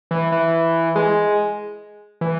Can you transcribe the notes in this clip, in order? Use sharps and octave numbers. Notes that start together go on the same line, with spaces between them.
E3
E3
G#3
E3